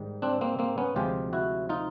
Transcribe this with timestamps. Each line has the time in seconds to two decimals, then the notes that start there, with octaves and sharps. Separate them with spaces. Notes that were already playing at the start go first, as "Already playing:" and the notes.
Already playing: G#2 D#3 G3
0.22 C4 D4
0.41 A#3 C4
0.59 A#3 C4
0.78 B3 C#4
0.96 D2 C3 F3 G#3 F4 G4
1.33 E4 F#4
1.69 D#4 F4